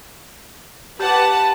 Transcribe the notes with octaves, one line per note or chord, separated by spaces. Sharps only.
G4 B4 F#5 A5